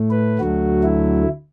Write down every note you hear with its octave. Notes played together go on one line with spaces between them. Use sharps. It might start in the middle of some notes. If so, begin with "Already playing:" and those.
Already playing: A2 A3
B4
D2 D3 F#3 A3 F#4
E4